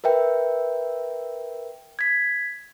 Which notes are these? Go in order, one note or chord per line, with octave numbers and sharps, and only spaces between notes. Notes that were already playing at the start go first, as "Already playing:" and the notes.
A#4 B4 E5 G5
G#6 B6